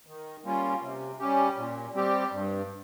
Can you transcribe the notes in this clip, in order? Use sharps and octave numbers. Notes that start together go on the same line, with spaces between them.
D#3
G3 A#3 C#4 F4
C3
G3 C#4 G4
A#2
G3 C4 G4
G2